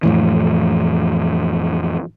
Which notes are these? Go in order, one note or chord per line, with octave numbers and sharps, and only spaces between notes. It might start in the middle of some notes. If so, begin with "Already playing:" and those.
F2 A2 E3